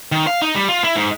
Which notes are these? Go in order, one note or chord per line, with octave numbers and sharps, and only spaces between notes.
D#3
F5
D#4
G3
F4
E4
G#2